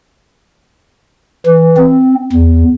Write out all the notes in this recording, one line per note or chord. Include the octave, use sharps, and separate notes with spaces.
E3
C4
E2